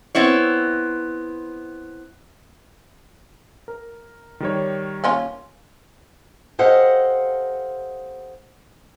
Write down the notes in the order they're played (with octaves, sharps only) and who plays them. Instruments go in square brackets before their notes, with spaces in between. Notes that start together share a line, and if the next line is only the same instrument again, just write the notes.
[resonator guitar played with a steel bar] B3 C4 E4 C#5
[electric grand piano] A#4
D#3 G3 C#5
[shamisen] A#3 C#4 F4
[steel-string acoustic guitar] G4 A4 C5 D#5 F5 F#5